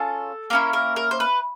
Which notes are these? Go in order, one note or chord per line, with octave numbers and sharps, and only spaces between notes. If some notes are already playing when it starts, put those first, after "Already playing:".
Already playing: C#4 F4 G#4 A4
A#3 C#4 E4 A#4
A#4
A#4
C5
B4